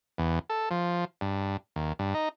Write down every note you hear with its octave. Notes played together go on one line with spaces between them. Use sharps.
E2
A4
F3
G2
D#2
G2
D#4